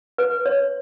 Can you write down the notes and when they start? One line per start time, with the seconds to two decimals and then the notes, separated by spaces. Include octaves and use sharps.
0.18 B4
0.46 C#5